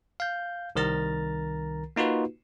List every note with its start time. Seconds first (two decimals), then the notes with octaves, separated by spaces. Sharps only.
0.20 F5 G6
0.75 C2 D#3 A#4 A#5 A6
1.96 A#3 D#4 F4 F#4 B4